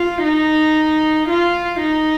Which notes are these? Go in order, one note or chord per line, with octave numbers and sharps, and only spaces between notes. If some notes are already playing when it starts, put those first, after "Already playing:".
Already playing: F4
D#4
F4
D#4